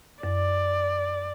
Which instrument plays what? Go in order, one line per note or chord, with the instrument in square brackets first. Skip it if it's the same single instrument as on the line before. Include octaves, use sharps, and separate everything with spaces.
[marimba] F#2 [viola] D5